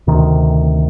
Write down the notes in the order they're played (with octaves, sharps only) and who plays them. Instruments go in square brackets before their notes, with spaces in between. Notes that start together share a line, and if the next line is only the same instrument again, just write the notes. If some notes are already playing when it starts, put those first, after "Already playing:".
[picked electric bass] D2 C3 D#3